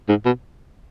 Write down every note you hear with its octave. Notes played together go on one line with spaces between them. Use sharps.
G#2
B2